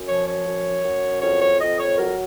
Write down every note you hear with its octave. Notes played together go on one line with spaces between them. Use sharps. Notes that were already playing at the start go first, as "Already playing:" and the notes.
Already playing: F#2
F3 C#5
C#5
F#2
F#2
F2 C#5
C#5
F2 D#5
C#5
F#3 A#4